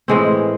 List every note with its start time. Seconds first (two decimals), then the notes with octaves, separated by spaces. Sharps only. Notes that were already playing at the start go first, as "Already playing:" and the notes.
0.08 A2 E3 G#3 C4